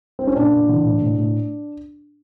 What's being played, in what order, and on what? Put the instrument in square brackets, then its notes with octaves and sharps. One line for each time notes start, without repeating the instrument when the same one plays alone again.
[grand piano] C4
C#4
A#2 D4
A#2
E3
A2
A2
A2